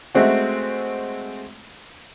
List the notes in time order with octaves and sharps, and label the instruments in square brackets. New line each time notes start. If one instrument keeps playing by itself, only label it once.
[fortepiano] G#3 A3 C4 F#4